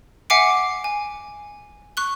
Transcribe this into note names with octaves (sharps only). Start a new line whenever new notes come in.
E5 F#5 G#5 D6 C7 D7
G#5
C#6 F#6 G7